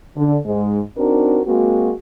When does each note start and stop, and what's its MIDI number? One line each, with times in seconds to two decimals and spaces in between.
0.16 0.37 50
0.46 0.80 44
0.46 0.80 56
0.97 1.41 60
0.97 1.41 62
0.97 1.41 63
0.97 1.41 66
0.97 1.41 70
1.46 1.92 56
1.46 1.92 58
1.46 1.92 60
1.46 1.92 66